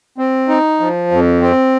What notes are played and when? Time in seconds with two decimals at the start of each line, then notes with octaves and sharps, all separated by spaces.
0.18 C4
0.48 D#4
0.80 F3
1.11 F2
1.42 C4